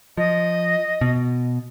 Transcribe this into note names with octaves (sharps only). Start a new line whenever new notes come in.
F3 D#5
B2